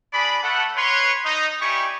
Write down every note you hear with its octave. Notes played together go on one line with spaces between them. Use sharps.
D4 G#4 D5 B5
A3 A4 F#5
B4 C#5 C6
D#4
G3 D#4 E4 G4 G#5 C#6